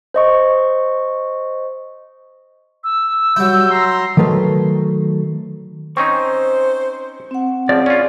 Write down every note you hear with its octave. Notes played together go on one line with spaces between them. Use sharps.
C5 D#5 C#6
E6
F#3 G3 E4 G6
A#5 C6
D#3 F#3 A3 A#4 B4
C4 C#4 D#4 C5 C#6
C4 F#5
C#3 F3 G#4 D5
C#4 F4